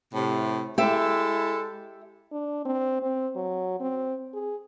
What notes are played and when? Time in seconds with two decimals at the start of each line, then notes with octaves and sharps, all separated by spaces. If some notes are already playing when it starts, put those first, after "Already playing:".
0.13 A2 C3
0.78 G#3 E4 G4 A4 E5
2.32 D4
2.65 C4
3.02 C4
3.36 F#3
3.80 C4
4.34 G#4